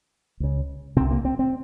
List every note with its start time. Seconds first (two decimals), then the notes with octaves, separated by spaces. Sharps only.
0.40 C#2 C#3
0.96 C2 C3 C4
1.11 A#3
1.25 C4
1.39 C4